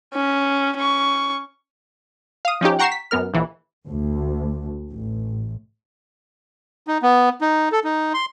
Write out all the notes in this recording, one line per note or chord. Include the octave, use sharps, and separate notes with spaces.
C#4
C#4 C#6
F5 D#6
F3 C#4 D#4 G4
F#5 G5 A#5 C#6 C7 E7
B6
F#2 B3 A#4 F6
A#1 E3
D2
A1
D#4
B3
D#4
A4
D#4
C6